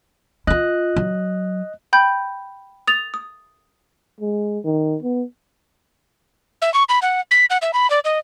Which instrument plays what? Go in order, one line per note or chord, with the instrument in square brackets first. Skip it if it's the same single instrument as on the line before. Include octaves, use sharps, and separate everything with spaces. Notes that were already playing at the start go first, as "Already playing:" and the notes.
[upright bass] E4 F4 [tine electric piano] D#5 F#6
[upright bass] F#3
[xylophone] G5 B5 G6
D#6 A6 F7
D#6
[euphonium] G#3
D#3
B3
[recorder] E5
C#6
B5
F#5
B6
F#5
E5
B5
D5
D#5